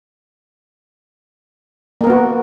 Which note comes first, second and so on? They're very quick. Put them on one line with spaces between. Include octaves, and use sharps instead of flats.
A#3 A#4 B3 F#4